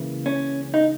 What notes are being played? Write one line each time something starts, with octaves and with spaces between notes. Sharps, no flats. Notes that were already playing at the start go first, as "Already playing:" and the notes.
Already playing: C#2 C#3 E3 A#3
C#4
D#4